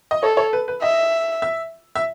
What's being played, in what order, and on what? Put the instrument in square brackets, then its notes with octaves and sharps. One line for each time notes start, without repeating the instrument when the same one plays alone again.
[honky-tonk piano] D#5
[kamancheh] A4 [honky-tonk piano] C#5
[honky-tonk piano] C#5
B4
B4
[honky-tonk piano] D#5 [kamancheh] E5
[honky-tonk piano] E5
E5